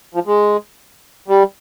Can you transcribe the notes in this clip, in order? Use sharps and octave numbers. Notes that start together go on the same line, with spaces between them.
F3
G#3
G3